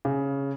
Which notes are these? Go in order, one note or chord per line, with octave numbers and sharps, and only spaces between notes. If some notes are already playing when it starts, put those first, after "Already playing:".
C#3